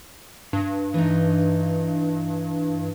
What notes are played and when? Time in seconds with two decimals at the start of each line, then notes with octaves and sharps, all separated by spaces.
0.53 G2
0.94 E3 D#4